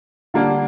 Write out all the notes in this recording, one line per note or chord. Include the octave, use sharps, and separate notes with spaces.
D3 G3 A#3 D4